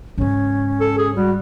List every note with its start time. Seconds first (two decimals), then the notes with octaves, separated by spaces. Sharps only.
0.18 G#2 C#3 C#4
0.81 A4
0.98 G#4
1.16 G3 F#4